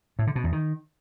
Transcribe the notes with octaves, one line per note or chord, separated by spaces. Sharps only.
A2
D3
B2
E2
D#3